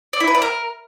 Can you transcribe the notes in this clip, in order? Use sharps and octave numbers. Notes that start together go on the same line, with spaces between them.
D5
E4
B4
D5
A#4